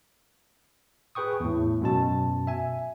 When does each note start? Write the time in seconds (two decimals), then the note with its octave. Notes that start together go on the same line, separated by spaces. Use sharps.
1.15 G#4 B4 G5 C#6 D#6
1.40 E2 A2
1.82 F#2 B2 A5
2.47 E5 G#5